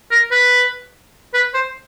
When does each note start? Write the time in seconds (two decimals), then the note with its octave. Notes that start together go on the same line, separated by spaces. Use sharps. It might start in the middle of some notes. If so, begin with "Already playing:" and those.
0.11 A#4
0.31 B4
1.34 B4
1.54 C5